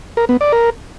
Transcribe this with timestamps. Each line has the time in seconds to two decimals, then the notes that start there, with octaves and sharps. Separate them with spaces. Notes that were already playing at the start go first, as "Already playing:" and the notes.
0.17 A#4
0.29 B3
0.41 D5
0.52 A#4